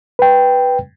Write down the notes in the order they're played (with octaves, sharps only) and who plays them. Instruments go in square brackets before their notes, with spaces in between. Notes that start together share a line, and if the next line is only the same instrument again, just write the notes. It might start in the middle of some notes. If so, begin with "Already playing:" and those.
[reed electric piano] B4 G5